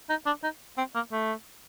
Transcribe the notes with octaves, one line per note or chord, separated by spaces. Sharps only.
D#4
D4
D#4
C4
A#3
A3